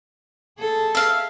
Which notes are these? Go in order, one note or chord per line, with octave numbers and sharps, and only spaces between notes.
G#4 A4
E5 F5